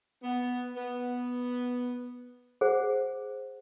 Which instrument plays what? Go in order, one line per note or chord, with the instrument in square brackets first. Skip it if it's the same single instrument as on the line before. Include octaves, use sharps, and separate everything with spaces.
[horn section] B3
B3
[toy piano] G#4 C5 F#5